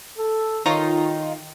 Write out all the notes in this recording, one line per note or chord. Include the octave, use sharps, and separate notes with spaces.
A4
D#3 D#4 F4 C#5 A#5